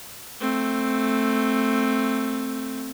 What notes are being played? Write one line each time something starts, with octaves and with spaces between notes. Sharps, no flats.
A3 C4